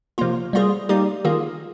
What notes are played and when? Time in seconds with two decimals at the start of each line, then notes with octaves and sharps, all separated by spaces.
0.18 C3 F3 A#3 F4
0.53 G3 A#3 F4 G#4
0.89 G3 A#3 D#4 G4
1.25 D#3 A#3 F4 G#4